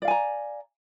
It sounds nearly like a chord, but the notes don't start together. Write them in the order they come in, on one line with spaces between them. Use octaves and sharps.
D5 F5 G#5 A#5